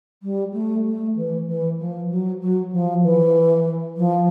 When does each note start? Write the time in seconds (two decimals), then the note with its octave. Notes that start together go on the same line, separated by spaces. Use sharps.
0.23 G3
0.53 A3
0.85 A3
1.16 E3
1.48 E3
1.79 F3
2.10 F#3
2.41 F#3
2.72 F3
3.03 E3
3.97 F3